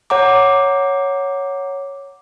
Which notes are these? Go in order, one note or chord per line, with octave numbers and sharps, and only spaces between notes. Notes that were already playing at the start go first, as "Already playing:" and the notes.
C#5 F#5 A#5 D6